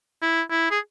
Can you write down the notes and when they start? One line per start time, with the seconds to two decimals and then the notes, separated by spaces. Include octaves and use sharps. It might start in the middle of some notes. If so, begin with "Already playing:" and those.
0.22 E4
0.51 E4
0.71 G#4